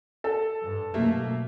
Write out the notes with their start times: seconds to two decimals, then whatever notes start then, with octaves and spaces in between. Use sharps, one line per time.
0.24 A4
0.63 G2
0.94 F#2 B2 A3 A#3